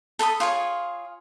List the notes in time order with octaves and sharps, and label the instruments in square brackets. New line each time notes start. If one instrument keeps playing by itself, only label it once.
[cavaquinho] A4 A5 B5 D#6
F4 G#4 C#5